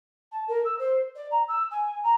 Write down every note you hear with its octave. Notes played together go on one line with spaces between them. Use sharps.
A5
A#4
E6
C5
D5
A#5
E6
G#5
A#5